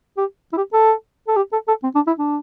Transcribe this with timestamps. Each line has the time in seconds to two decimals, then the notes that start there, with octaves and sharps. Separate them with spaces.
0.17 G4
0.53 E4
0.57 G4
0.73 A4
1.27 A4
1.36 G4
1.52 A4
1.68 A4
1.83 C4
1.95 D4
2.07 E4
2.19 D4